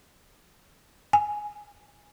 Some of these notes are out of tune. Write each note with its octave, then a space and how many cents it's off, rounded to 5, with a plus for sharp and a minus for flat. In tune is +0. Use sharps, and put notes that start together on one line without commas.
G#5 +5